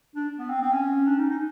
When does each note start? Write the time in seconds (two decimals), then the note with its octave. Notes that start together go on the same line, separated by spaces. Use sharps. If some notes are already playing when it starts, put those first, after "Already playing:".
0.15 D4
0.38 B3
0.50 C4
0.61 C4
0.72 C#4
1.07 D4
1.18 D#4
1.30 D#4